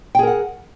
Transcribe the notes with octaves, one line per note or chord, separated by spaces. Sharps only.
G#4 A#4 F#5 G5